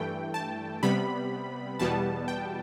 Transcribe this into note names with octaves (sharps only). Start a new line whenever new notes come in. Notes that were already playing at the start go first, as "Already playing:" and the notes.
Already playing: G2 E3 A3 G5
A5
C3 G3 B3 B5
E2 B2 G3 B3 A5
G5